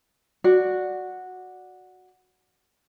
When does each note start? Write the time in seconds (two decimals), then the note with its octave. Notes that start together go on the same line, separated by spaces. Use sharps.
0.44 F#4 D5